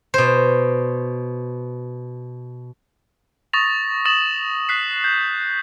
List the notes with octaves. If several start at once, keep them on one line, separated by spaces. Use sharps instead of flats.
B2 C5
C#6 D#6 A6 A#6 F7
C#6 D#6 A6 E7 F#7
F#6 B6 C7
G6